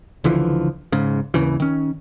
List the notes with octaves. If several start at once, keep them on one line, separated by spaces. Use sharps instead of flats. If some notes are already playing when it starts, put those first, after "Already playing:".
C#2 D3 E3 F3
G#2 C#3
G#1 D#2 C#3 E3
D#3 C#4